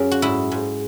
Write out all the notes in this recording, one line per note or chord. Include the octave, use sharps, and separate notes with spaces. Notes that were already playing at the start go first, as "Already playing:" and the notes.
Already playing: F#2 C#4 G#4
F#4
G#2 E4
G#2